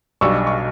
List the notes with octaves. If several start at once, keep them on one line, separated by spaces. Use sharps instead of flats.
B1 B2 G3 D4 C#6 E6
C#6